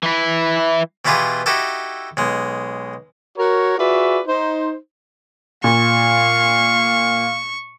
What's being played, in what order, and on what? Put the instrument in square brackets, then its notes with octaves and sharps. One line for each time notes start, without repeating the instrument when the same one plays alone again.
[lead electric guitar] E3 E4
[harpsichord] B2 E3 B3 F4 G4 G#4
D#4 E4 F#4 G4 A4
B1 G#3
[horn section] F#4 A#4 C#5
F4 F#4 G#4 B4 D5 E5
D#4 C5
[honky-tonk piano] A#2 [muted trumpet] F5 [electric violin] C#6